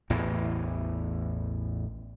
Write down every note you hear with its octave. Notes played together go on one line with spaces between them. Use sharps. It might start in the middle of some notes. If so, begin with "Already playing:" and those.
A1 E2 A2 E3